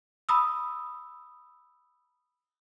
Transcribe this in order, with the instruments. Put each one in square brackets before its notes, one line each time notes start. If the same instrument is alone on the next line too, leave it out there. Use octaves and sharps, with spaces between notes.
[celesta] A#5 B5 D#6 E6